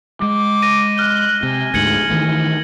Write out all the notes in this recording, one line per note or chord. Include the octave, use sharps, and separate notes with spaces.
G#3 D6
A#6 D#7
F6 F#6 G7
C3 G#5
D2 G#2 G#6 C#7 F#7
D#3 E3 A3